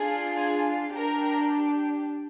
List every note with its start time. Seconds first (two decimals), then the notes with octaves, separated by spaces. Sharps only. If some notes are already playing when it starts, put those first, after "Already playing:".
Already playing: D4 F4 G#4
0.37 G#4 G#5
0.94 D4 G4 A#4 A#5